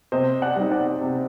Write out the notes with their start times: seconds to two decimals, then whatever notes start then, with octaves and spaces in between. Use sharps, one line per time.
0.12 C3 C5 D#5
0.42 D5 F#5
0.56 G3 C4 D#4
0.71 D5 F#5
1.01 C3